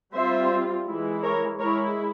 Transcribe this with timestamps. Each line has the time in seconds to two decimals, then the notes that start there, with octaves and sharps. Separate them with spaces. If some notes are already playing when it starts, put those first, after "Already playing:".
0.14 G3 C4 F4 C5 E5
0.87 E3 G#3 E4
1.23 A#4 C#5
1.59 G#3 E4 A#4 C#5